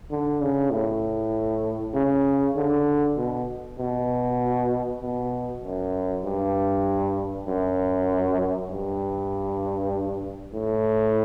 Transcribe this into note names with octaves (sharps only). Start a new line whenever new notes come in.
D3
C#3
A2
C#3
D3
B2
B2
B2
F#2
G2
F#2
G2
A2